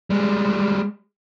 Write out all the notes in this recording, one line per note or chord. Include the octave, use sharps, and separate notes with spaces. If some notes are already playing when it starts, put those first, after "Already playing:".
G3 G#3